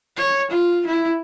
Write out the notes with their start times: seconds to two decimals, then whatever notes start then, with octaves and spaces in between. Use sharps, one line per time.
0.17 C#5
0.51 F4
0.87 E4